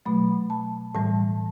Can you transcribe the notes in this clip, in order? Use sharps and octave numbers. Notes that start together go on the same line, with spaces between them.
B2 F#3 A3 B5
A5
A2 E3 G3 A5